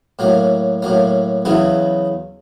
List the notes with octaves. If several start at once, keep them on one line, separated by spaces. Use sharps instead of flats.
A2 F#3 A#3
A2 F#3 A#3
E2 C#3 F#3 B3 E4